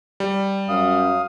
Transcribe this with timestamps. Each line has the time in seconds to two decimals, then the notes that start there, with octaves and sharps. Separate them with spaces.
0.20 G3
0.69 F#2 F5 D#6